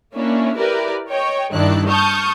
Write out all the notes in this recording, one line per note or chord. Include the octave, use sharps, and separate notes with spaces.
A#3 C#4 D4 E4
E4 G4 A#4 B4 D5
C#5 D#5 G5
G2 D#3 D4 E4 D5 F#6
A5 C#6 D#6 F6 G6